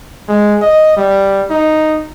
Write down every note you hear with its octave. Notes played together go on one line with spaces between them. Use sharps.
G#3
D#5
G3
D#4